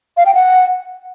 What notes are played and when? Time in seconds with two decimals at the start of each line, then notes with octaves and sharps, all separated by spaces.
0.17 F5
0.26 G5
0.35 F#5